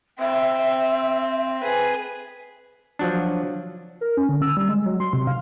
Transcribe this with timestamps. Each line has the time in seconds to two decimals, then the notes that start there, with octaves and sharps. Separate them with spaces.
0.19 C4 E5
1.61 G#4 B4
2.99 F3 F#3 D4
4.01 A#4
4.17 C#4
4.29 D3
4.42 E6
4.57 G3
4.69 G#3
4.86 F#3
5.00 C6
5.13 C3
5.27 F5